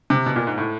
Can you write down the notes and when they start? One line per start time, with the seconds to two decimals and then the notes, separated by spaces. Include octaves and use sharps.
0.10 C3
0.26 B2
0.36 A#2
0.47 G#2
0.58 A2